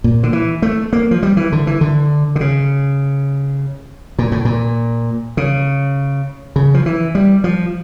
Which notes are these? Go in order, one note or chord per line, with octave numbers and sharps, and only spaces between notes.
A#2
D3
E3
A3
A#3
F3
G3
E3
D3
E3
D3
D3
C#3
A#2
A2
A#2
C#3
C#3
F3
E3
G3
F3